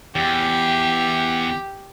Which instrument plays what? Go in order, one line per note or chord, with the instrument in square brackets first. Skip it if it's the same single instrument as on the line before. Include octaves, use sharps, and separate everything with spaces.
[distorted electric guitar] E2 [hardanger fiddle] G4